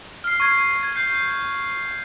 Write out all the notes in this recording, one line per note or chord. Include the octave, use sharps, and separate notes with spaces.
F6 C7
C#6 G#6 C7
G#6
G6 C7